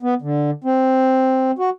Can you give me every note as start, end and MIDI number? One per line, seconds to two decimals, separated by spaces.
0.03 0.14 59
0.22 0.51 50
0.64 1.51 60
1.59 1.70 66